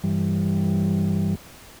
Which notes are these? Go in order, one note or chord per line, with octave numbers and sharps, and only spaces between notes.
G2 E3 G3